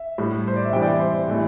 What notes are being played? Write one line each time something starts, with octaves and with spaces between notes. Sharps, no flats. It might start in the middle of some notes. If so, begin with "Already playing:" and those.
Already playing: E5
A2 G3
C5
D5
E5
C3 E3 G3 G5
D5
E5
C5
C5
A2 E3 A3